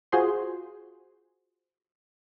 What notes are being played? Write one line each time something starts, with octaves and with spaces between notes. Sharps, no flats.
F4 F#4 G#4 C5 C6